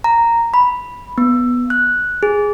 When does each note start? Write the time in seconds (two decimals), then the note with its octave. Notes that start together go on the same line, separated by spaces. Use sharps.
0.04 A#5
0.54 B5
1.18 B3
1.70 F#6
2.23 G#4